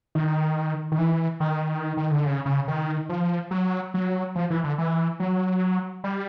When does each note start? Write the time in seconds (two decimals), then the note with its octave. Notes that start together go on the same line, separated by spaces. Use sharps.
0.15 D#3
0.92 D#3
0.98 E3
1.40 D#3
1.97 D#3
2.11 D3
2.26 C#3
2.46 C#3
2.68 D#3
3.09 F3
3.51 F#3
3.94 F#3
4.35 F3
4.50 E3
4.64 D3
4.78 E3
5.20 F#3
6.04 G3